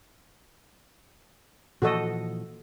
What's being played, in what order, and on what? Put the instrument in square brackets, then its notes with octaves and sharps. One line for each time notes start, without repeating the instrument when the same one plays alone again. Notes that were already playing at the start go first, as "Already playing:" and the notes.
[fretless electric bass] A#2 E3 F3 [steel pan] F#4 A4 D#5